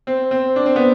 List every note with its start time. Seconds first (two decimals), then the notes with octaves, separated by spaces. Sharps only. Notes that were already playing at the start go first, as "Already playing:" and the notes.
0.07 C4
0.31 C4
0.56 D4
0.66 C4
0.76 B3